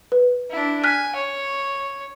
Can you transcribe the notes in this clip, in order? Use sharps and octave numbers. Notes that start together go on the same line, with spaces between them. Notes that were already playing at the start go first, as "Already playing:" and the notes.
B4
D4 E4
G#5 F6 F#6 B6
C#5